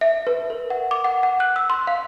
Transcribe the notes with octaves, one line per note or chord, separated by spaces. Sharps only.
E5
B4
A#4
F#5
D6
F#5
F#5
F#6
E6
C6
F5